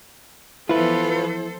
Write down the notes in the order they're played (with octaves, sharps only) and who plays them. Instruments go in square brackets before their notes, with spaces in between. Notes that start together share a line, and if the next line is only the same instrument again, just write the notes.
[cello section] E3 F3 B3 [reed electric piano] E4 [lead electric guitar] F4 B4 [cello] A4 C5